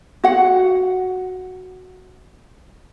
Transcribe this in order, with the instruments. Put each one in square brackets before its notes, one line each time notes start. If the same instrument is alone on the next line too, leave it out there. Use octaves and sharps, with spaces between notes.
[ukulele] F#4 F#5